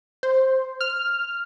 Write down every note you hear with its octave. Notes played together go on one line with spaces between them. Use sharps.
C5
F6